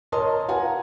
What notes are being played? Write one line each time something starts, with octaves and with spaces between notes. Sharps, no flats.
A#4 C#5 D#5 A5 C6 D#6
A#4 B4 F5 F#5 G#5 A#5